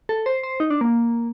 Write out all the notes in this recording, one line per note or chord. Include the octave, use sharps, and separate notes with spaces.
A4
C5
C5
D#4
D4
A#3